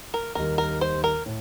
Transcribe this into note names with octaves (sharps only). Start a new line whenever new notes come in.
A#4
D#2 D#3 G3 A#4
A#4
C5
A#4
A2